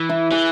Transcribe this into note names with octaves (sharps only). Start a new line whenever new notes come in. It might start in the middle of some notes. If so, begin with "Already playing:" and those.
Already playing: E3
E4
E3 G#4